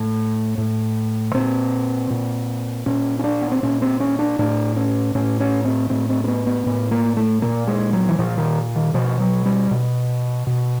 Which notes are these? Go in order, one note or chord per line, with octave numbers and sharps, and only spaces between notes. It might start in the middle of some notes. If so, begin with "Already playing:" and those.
Already playing: A2
A2
A#2 C4
A#2
A#2 C#4
C#4
D4
B3
C4
A#2 C#4
C4
C#4
D4
A2 D4
C#4
A2 C#4
C#4
C4
A2 C4
C4
C4
B3
B3
A2 B3
A#3
A3
A#2 A#3
G#3
F#3
E3
A#2 F3
D#3
D#3
B2 F3
F#3
G3
B2
B2